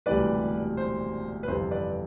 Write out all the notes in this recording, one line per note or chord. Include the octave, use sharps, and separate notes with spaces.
E1 D2 C3 E3 G3 B4 D5
C5
B4
G1 F2 C3 E3 C5
B4 D5